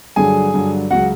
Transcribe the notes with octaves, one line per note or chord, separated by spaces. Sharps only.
G2 D3 F#3 G#4 G#5
G2 D3 F#3
C#2 C#3 F#3 F#4 F#5